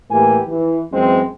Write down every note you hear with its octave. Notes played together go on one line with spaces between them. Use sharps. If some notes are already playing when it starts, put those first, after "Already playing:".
A2 E3 A#3 G4 G#5
E3
F#2 E3 G#3 C4